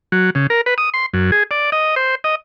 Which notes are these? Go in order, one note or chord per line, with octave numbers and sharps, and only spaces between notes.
F#3
C#3
A#4
B4
D#6
C6
F#2
G#4
D5
D#5
C5
D#5